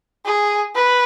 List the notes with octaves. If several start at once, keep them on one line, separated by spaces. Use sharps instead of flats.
G#4
B4